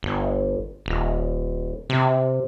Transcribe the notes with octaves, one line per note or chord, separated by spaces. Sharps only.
G1
D#1
C3